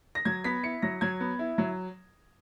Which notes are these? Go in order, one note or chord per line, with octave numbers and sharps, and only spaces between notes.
A#6
F#3 G#6
B3 B6
E4 C#7
F#3 A#6
F#3 G#6
B3
E4
F#3